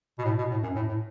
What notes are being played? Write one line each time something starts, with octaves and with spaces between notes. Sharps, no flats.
B2
A2
B2
A2
F#2
A2
A2